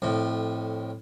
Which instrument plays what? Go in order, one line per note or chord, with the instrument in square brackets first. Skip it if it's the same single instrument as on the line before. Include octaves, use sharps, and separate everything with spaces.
[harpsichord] F2 A2